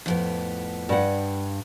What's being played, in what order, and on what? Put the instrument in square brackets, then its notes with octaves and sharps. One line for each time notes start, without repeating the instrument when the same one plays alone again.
[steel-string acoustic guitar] F2 A2 B3
[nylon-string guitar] G2 F#5